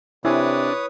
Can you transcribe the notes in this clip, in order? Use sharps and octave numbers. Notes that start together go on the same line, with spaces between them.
C3 D4 E4 B4 C#5 G#5 D#6